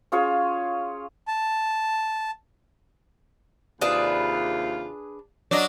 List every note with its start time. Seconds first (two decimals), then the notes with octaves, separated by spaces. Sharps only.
0.12 C#4 F4 G#4 C#5
1.28 A5
3.81 D#2 C3 D4 F4 G#4 B4
5.51 F#3 D4 D#5